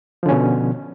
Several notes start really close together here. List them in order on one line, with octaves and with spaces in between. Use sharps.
F3 D3 C#4 B2